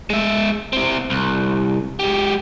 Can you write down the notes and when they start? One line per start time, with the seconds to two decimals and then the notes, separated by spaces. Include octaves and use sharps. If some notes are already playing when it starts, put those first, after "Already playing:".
0.10 G#3 E5
0.73 C4 E4
1.10 C2
1.99 G#3 G4